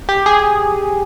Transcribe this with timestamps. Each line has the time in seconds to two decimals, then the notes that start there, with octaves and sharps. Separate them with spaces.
0.09 G4
0.26 G#4